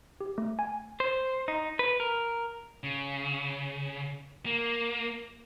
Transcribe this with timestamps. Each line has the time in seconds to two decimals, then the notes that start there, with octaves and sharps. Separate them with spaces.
0.20 G4
0.38 A3
0.59 G#5
1.00 C5
1.48 D#4
1.79 B4
2.00 A#4
2.83 C#3
4.46 A#3